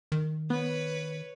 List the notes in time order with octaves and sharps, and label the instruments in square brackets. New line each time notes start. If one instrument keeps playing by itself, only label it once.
[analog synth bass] D#3
[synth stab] B3 [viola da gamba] B4 C#5